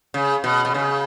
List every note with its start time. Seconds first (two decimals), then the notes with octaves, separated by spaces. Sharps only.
0.14 C#3
0.44 B2
0.65 B2
0.74 C#3